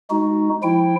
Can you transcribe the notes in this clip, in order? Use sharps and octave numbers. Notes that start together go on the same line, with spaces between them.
G#3 D#4 F#4
F3 E4 G5